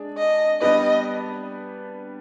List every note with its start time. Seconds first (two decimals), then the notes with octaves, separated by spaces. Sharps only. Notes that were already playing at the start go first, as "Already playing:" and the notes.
Already playing: G#3 D4 G#4
0.18 D#5
0.61 G3 B3 D4 G4 B4 D#5